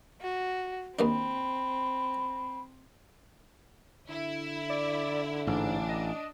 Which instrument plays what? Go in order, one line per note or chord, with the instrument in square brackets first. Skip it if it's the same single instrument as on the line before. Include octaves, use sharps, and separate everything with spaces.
[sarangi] F#4
[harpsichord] D#2 D#3 D4 [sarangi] C4 [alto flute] B5
[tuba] D3 [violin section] E4
[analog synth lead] D5
[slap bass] A1 [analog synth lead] G#2 [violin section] D4
[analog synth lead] D#5